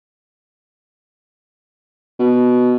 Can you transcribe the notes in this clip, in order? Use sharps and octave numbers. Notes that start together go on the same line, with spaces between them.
B2